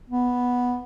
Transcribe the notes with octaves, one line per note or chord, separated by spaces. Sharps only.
B3